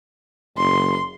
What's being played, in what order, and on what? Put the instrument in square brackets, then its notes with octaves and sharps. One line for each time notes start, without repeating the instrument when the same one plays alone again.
[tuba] F#1 [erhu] C6